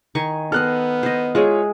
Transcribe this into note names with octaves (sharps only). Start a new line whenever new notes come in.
D#3 G#5 C#6
B3 A4 C5 D#5 F6 F#6
C5 D#5
G#3 F4 G#4 C#5 E5